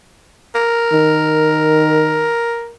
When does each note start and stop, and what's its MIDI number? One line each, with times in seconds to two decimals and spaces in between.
0.55 2.72 70
0.93 2.34 51